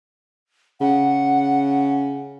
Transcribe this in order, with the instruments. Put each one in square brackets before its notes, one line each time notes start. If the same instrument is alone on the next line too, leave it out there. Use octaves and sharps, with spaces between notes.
[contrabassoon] C#3 [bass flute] F#5